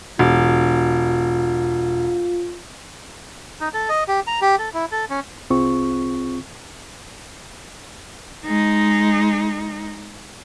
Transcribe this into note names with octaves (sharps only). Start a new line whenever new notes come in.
E1 F4
D#4
A4
D#5
G4
A#5
G4
A4
E4
A4
C#4
C2 C4 F4 G#4 C#6
G#3 D#4